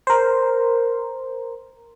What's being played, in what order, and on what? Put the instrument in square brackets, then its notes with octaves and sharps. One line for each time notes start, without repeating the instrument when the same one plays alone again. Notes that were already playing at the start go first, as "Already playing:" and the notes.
[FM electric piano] A#4 C5